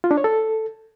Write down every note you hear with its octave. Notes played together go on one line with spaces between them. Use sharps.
F4
D4
C#5
A4